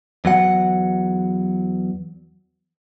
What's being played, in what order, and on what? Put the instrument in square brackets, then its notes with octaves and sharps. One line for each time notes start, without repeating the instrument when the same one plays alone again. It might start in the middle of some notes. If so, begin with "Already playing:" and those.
[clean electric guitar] E2 F#3 F#5